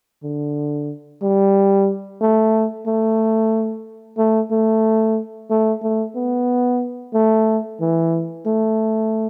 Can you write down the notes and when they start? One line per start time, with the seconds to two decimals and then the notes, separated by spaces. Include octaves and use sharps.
0.23 D3
1.22 G3
2.21 A3
2.87 A3
4.18 A3
4.51 A3
5.51 A3
5.82 A3
6.16 B3
7.14 A3
7.81 E3
8.46 A3